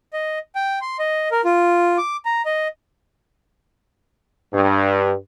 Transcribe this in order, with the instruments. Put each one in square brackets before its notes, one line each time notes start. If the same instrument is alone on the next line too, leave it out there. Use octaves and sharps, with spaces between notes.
[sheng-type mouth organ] D#5
G5
C6
D#5
A#4
F4
D6
A#5
D#5
[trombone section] G2